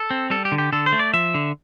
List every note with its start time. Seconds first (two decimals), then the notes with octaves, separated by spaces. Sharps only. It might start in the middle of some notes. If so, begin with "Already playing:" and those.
Already playing: A4
0.10 C4
0.30 G3 A4
0.45 G4
0.52 D3
0.58 G4
0.72 D3 A4
0.86 C5
0.92 A3
0.99 D5
1.13 F3 E5
1.34 D3